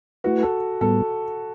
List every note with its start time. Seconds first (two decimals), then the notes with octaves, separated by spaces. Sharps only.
0.24 A3 E4 F#4 B4
0.43 A4
0.81 A2 G3 B3 A4